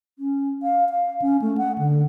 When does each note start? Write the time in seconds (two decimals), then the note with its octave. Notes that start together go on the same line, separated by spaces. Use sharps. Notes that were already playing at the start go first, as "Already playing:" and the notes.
0.19 C#4
0.63 F5
0.89 F5
1.22 C#4
1.42 A3
1.57 F#5
1.78 D3